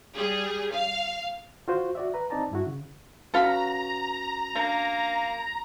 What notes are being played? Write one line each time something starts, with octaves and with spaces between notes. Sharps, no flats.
G3 G#4
F5
F4 F#4 C5
F#4 D5 E5
B4 A#5
C4 D#4 D5 A5 A#5
G2 E4 F#4
C#3
C#4 F#4 A4 B4 F5 A#5 B5
A#3 D4